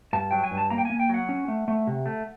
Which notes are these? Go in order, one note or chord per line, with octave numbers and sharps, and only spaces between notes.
G2 A5
F#3 G5
G#5
G2
A5
A#3 A#5
G5
A#3 G#5
G5
F#3 F#5
C#4
A3
A3
C3
A3